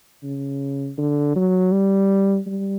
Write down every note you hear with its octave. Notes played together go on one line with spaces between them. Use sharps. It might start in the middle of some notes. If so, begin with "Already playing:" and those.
C#3
D3
F#3
G3
G3